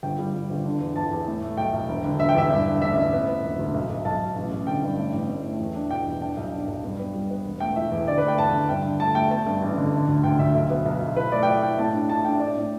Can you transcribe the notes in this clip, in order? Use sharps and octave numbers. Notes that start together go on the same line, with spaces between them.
G1 G5
G3
G3
G1
D3
E2
E2 A5
E2
A2
A3
B1 G5
B1
E1
D3
E1 E5
G5
E2 E5
G2
D3
A1 E5
A1
B3
B3
E1
D2
B1
B1
B1 A5
B1
A1
A1
D3 G5
G2
A2
A1
A2
A3
E2
D4
B2 G5
E2
D4 G5
B1
D4
B1
G2
B3
G3
B3
E1
A3 G5
E3 E5
E2
D3 D5
B4
A3
G5
E2 A5
D3
G2 G5
D3
A3 A5
A3 G5
B3 A5
G2
A1
D3
D3
D2
D2 G5
D2 E5
B1
B3
B1
B1
E4 B4
A3 D5
G5
E4 E5
E4 G5
A2 A5
D4
A3 A5
D4 G5
A2 D5
A2